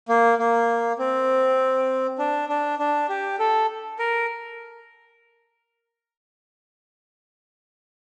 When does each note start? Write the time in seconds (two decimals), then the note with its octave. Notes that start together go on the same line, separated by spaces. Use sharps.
0.09 A#3
0.39 A#3
0.99 C4
2.19 D4
2.49 D4
2.79 D4
3.09 G4
3.39 A4
3.99 A#4